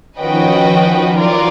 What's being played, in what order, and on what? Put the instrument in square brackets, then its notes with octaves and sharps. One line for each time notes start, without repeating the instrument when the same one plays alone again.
[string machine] D#3 F3 [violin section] C#4 F#4 B4 D#5 G5
[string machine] E3 F#3 [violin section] F4 A#4 D5